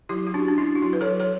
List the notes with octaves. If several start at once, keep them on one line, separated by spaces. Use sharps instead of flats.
F#3 E4 G4
G4
C#4 D4 F#4
D4
C#4 E4
F#4
F#3 E4
B4
A4 C#5
F#3
A4 C#5